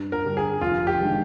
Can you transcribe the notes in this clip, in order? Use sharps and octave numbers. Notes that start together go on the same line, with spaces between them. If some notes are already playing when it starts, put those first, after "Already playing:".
Already playing: G2
A#4
D3 G3 D4 G4
G#4
F1 F4
G4
D#3 G#3 D4